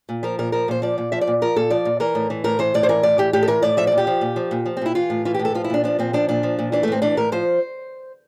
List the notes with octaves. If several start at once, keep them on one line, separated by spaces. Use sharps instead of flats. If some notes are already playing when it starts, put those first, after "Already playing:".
A#2
F3 A#4
A#2 A#4
F3 A#4
A#2 C5
F3 D5
A#2
F3 E5
D5
A#2
F3 A#4
A#2 A4
F3 D5
A#2
E3 A#4
A2
E3
A2 A#4
E3 C5
A2 D5
C5
E3 A#4
A2 D5
E3 G4
A2 G4
A4
E3 A#4
A2 D5
F3 E5
D5
A#2
G4
F3
A#2
F3
A#2
F3
C4
A#2 E4
E3 F4
A2
E3 F4
G4
A2
A4
F3 F4
E4
A#2 D4
F3 D4
A#2 C4
F3 D4
A#2 D4
F3
A#2
E3 D4
A3
A2 C4
E3 D4
A2 A#4
F3 C5